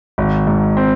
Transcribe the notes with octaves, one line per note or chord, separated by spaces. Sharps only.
G#1
G#2
C4